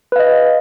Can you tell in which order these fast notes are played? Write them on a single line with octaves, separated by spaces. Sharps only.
B4 F5 D#5